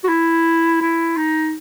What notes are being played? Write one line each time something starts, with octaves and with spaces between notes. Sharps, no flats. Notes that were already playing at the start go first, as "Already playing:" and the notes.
F#4
E4
E4
D#4